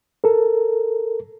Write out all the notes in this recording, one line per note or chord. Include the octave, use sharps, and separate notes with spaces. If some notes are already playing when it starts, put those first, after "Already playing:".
A4 A#4